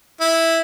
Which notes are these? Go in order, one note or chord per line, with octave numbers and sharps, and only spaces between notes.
E4